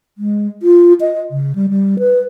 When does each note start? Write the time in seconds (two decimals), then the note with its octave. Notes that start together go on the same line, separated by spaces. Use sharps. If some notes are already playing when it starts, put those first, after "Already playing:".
0.18 G#3
0.63 F4
1.01 D#5
1.31 C#3
1.55 G3
1.69 G3
1.99 B4